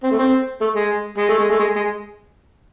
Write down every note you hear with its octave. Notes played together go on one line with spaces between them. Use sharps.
C4
A3
C4
A3
G#3
G#3
A3
G#3
A3
G#3
G#3